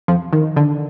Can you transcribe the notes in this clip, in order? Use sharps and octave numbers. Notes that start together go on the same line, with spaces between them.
F2 F3
D#3
D3